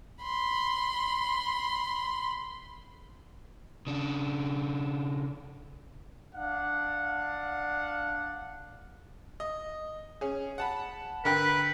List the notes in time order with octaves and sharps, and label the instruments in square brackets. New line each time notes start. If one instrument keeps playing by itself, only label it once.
[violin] B5 C6
[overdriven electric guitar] C#3 D4
[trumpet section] D4 F5 F#5
[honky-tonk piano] D#5
C#4 G#4
F#5 A5 B5
[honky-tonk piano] D3 A#4 G5 [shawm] B4